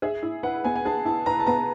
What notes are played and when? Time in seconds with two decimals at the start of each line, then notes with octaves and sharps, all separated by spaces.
0.02 G#4 E5
0.23 E4
0.43 B4 F#5
0.64 B3 G#5
0.76 G#5
0.85 G#4 A5
1.05 E4 A5
1.26 B4 A#5
1.40 A5
1.47 B3 A#5